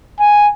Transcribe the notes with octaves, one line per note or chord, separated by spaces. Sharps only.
G#5